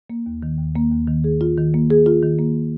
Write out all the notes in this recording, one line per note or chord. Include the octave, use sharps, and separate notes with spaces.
A#3
D#2
D#3
D#2
A#3
D#2
D#3
G#4
F4
D#3
A#3
G#4
F4
D#3
A#3